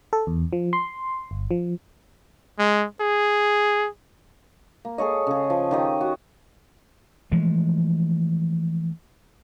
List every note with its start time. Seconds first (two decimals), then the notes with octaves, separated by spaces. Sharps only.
0.13 A4
0.27 E2
0.53 F3
0.73 C6
1.31 G1
1.51 F3
2.59 G#3
3.01 G#4
4.85 A#3
4.98 G#4 A4 C#5 D#5
5.27 C#3 G#4
5.50 F3
5.71 D#3 G4 D#5
6.01 F#4
7.32 E3 F3 G#3 A3